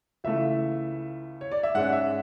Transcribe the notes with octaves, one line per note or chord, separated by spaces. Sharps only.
C#2 C#3 E3 A3 E5
C#5
D5
E5
G#2 G#3 C#4 F#5
E5